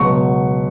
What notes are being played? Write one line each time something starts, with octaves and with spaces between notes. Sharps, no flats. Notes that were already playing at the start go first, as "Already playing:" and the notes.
Already playing: C#2 B2 F#3 C#6